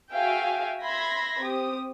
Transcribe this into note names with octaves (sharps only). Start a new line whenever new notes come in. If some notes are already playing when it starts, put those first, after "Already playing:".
F#4 G#4 E5 F5 G5 G#5
E5 B5 C6 G#6 A#6 B6
C4 G4 D#6